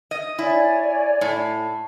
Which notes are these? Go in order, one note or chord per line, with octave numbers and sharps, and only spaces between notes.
D#5
E4 C#5 D5 G#5
A2